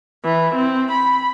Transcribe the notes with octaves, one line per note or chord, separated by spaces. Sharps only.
E3
C4
B5